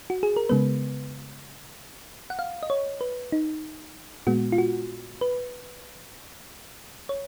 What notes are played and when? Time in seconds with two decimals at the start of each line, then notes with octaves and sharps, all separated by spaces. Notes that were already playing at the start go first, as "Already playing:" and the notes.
0.10 F#4
0.23 G#4
0.36 A#4
0.49 C#3 G#3 B3 B4
2.30 F#5
2.39 F5
2.63 D#5
2.70 C#5
3.01 B4
3.32 D#4
4.27 A#2 G#3 B3 F#4
4.52 F4
4.58 F#4
5.21 B4
7.09 C#5